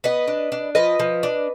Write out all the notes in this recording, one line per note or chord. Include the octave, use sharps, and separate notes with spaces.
B3 B4 D#5
D4
D4
F3 B4 D#5
F3
D4